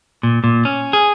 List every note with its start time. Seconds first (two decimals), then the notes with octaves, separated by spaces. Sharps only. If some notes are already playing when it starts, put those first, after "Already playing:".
0.23 A#2
0.44 A#2
0.65 C#4
0.93 G#4